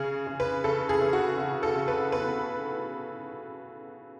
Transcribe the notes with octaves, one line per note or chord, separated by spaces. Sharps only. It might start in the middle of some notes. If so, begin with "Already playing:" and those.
Already playing: C#3 G#4
C#3
B4
C#3 A4
G#4
C#3
F#4
C#3
A4
C#3
B4
B3 B4